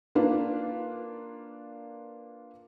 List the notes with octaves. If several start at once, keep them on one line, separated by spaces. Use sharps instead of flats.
A#3 D4 F4 B4